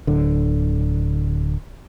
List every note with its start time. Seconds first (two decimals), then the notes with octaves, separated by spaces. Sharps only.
0.07 D1 D3